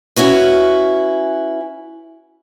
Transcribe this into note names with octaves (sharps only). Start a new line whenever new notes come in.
C#4 E4 F#4 B4